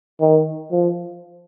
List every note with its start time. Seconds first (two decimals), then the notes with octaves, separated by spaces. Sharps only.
0.21 D#3
0.72 F3